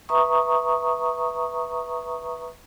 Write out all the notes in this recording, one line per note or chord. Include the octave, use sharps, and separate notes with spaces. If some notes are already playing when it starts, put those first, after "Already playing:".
B4 E5 A#5 C#6 D#6